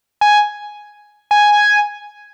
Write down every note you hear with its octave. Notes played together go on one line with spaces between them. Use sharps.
G#5
G#5